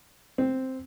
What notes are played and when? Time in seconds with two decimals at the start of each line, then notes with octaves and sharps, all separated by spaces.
0.38 C4